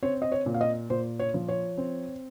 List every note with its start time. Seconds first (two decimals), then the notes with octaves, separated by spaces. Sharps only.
0.03 C4 C#5
0.22 D#5
0.32 C#5
0.46 A#2
0.54 F5
0.61 D#5
0.90 A#2 C5
1.19 C#5
1.34 F3
1.48 C#5
1.77 C4